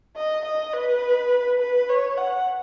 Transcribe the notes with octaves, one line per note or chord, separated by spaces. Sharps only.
D#5
D#5
B4
B4
C#5
F#5